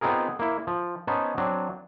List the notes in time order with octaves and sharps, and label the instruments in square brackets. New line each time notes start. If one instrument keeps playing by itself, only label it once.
[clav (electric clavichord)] B3 C4 D#4 F4 G#4 A#4
A#3 E4
F3
B3 C#4 D#4 C5 G#5 A5
F#3 C4 D4